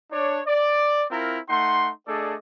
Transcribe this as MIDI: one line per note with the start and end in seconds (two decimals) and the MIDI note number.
0.11 0.40 62
0.11 0.40 73
0.46 1.04 74
1.10 1.38 60
1.10 1.38 64
1.10 1.38 65
1.10 1.38 70
1.49 1.90 57
1.49 1.90 63
1.49 1.90 78
1.49 1.90 84
2.07 2.35 57
2.07 2.35 62
2.07 2.35 68
2.07 2.35 69
2.07 2.35 74
2.07 2.35 75